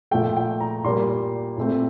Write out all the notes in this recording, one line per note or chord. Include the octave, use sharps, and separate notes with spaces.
A#2 F3 A3 G5
G5
A#5
A#2 G3 A#3 C6
A#2 A3 C4